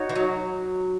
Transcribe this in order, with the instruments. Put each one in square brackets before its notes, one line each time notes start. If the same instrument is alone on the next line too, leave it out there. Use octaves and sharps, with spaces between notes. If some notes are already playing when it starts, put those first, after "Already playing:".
Already playing: [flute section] D#4 F#4 C#5 F#5
[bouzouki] E3
F#3